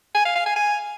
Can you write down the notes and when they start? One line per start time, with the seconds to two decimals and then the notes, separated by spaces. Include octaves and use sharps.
0.15 G#5
0.25 F5
0.36 F5
0.46 G#5
0.56 G#5